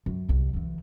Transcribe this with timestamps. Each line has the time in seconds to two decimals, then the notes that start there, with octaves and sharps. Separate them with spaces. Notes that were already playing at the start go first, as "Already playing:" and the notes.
0.06 F#2
0.29 C2
0.53 D2 E3